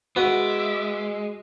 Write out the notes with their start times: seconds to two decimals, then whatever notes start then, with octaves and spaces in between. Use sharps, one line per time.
0.16 G#3 B3 F#4 E5 D6